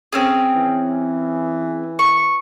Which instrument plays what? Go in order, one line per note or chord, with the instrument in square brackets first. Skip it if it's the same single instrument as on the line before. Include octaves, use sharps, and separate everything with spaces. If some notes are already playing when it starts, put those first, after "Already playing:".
[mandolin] C4 C#4 G#4
[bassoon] E3
[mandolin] C#6